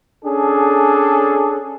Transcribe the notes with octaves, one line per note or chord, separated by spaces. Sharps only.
C#4 D4 G#4 A4